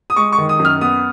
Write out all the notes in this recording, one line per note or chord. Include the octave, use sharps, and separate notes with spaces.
D#6
G#3 C#6
C#6
D#3
D#6
F#2
F6
B3 D#6